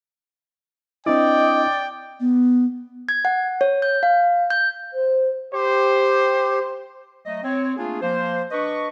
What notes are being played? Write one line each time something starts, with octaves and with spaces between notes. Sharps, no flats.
C4 D4 E4 D5 D#5 G5
B3
G#6
F#5
C#5
G6
F5
G6
C5
G4 C5
F#3 A3 D#5
C4 C#5
A3 A#3 D4 F4 G#4
F3 A#3 C5
D4 B4 D#5 C#6